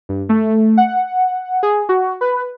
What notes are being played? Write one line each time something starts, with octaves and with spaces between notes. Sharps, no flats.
G2
A3
F#5
G#4
F#4
B4